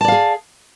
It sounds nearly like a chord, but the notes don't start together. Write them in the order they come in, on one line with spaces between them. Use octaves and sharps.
A5 D5 F5 G#4